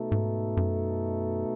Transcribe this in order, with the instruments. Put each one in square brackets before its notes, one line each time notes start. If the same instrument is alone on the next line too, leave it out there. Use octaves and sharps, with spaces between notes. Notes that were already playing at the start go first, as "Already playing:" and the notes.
Already playing: [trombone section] B2 A3 D#4 A4
[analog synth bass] G#2
F#2